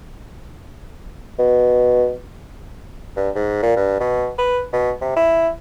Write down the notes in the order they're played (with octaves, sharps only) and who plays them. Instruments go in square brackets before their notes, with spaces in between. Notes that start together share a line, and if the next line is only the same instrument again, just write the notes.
[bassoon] B2
G2
G#2
A#2
G2
B2
B4
B2
C3
E4